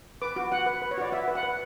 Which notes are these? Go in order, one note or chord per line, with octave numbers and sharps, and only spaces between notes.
B4 D6
F#4 D6
F#4 F#5
B4
B4
C#5
F#4 D5
F#4 E5
B4
F#5
B4